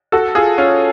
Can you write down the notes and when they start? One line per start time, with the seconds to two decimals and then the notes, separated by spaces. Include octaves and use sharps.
0.12 F#4 A4
0.35 F4 G#4
0.58 C#4 F4